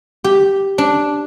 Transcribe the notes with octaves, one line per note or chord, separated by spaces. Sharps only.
G4
D4